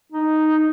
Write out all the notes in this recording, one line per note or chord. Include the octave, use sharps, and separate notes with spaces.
D#4